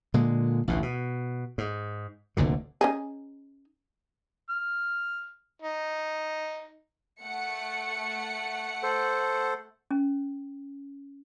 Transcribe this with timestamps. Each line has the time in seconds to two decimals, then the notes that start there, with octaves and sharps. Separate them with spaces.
0.14 A#2 D3 G#3
0.68 A1 D2 B2
0.83 B2
1.58 G#2
2.37 F1 D2 A#2 D3
2.81 C#4 D#4 G#4
4.50 F6
5.62 D#4
7.20 A3 F#5 C#7
8.83 A4 C5
9.91 C#4